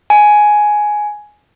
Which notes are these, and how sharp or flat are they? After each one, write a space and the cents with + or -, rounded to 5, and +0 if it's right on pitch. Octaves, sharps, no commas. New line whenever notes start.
G#5 +10